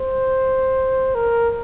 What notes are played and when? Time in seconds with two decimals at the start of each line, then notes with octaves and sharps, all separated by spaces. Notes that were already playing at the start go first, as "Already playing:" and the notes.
Already playing: C5
1.15 A#4